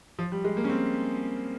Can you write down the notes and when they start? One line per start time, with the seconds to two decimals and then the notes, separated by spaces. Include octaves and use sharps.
0.19 F3
0.32 G3
0.44 G#3
0.57 A#3
0.64 C#4
0.69 C4